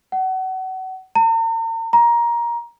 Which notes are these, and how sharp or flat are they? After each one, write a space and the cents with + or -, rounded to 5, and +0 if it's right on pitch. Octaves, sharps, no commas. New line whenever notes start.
F#5 +30
A#5 -45
A#5 +15